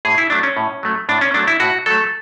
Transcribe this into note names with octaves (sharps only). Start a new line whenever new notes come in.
A2 G#4
E4
F#3 A3 D4
C#4
A2
F#3 A3
A2 D4
C#4
F#3 A3 D4
E4
A2 F#4
F#3 A3 A4